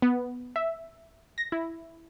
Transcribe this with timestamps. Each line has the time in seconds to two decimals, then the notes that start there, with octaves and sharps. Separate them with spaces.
0.02 B3
0.56 E5
1.38 A#6
1.52 E4